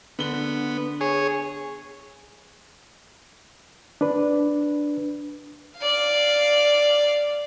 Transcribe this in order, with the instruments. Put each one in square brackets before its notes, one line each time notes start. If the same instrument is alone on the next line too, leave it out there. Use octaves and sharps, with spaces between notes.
[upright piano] D3 G7 [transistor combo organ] B3
[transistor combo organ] B3
G#4 C#5
[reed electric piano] D4 B4
[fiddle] D5 F5